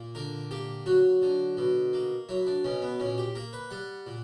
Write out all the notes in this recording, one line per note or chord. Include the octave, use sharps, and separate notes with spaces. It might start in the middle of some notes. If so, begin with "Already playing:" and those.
Already playing: A#2 A#3
D3 A#4
A#3 G4
F#3 F#4
D3
B2
A#3
F#3 E4
D4
B2 C#4
B3
A#2 C#4
G4
A#3 A#4
B4
G3 F#5
A#2